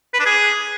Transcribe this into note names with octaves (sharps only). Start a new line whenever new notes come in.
B4
D4
G#4